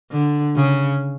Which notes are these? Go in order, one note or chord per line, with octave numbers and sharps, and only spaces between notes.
D3
C#3